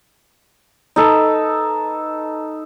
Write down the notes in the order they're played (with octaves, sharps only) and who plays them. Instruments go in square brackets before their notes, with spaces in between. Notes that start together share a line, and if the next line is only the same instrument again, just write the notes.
[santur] D#4 A4 B4